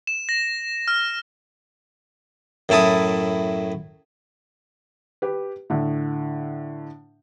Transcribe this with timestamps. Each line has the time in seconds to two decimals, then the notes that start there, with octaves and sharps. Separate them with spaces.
0.07 E7
0.29 A#6
0.88 F6
2.69 F#2 A2 E4 A5 D#6
5.22 G4 B4
5.70 A2 D3